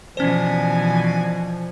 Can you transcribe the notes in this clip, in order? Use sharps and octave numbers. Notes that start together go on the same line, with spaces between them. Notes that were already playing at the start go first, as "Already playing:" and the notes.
B2 E3 F3 C#4 D4 C5 G#5